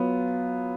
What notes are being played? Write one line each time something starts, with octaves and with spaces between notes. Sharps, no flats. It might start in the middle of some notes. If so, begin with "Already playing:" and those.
Already playing: F#3 B3 F4